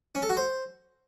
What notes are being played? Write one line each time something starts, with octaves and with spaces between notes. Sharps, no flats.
C#4
A4
F#4
C5